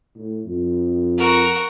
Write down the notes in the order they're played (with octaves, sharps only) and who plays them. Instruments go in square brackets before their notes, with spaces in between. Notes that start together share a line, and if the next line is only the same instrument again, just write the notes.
[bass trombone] A2
F2
[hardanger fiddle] F#4 A#4